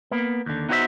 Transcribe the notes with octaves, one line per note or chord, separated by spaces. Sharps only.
A#3 B3
D#2 D3
B3 D#4 F#4 C5 C#5 E5